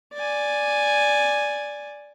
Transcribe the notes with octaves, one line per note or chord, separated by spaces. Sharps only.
D5 G#5